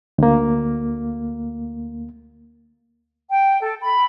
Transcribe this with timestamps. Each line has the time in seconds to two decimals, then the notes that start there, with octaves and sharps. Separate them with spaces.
0.18 D2 A#3
3.29 G5
3.62 A4
3.83 B5